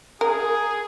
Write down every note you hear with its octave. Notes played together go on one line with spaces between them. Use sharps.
G#4 A#4